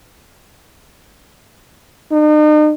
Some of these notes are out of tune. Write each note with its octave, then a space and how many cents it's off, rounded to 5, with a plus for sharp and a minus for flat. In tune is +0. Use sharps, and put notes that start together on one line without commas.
D#4 -40